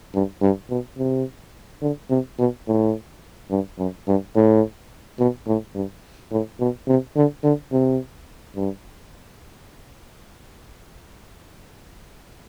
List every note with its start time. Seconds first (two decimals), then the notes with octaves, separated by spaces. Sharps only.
0.14 G2
0.42 G2
0.70 B2
0.98 C3
1.82 D3
2.10 C3
2.38 B2
2.67 A2
3.51 G2
3.79 F#2
4.08 G2
4.36 A2
5.19 B2
5.47 A2
5.75 G2
6.32 A2
6.60 B2
6.88 C3
7.16 D3
7.44 D3
7.72 C3
8.56 G2